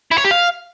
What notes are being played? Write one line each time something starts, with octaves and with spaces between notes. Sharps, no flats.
E4
C#5
G4
F5